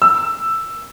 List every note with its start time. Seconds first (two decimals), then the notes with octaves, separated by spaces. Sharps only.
0.02 E6